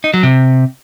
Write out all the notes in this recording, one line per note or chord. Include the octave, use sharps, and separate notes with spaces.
D#4
F#3
C3